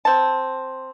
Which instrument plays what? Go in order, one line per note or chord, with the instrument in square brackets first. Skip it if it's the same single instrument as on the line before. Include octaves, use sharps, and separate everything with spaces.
[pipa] C4 A5